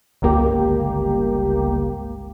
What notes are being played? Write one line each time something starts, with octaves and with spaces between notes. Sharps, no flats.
G1 C#2 A#3 G4